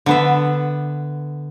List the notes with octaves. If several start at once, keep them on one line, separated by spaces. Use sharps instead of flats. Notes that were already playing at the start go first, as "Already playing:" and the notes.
D3 B3 E5